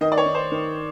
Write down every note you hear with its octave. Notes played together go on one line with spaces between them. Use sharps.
D#3 D#5
D5
C#5
D#3
C5
D#3